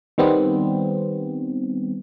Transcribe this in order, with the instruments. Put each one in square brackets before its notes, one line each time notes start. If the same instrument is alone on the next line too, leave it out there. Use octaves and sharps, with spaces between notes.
[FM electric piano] D#3 G3 B3 C4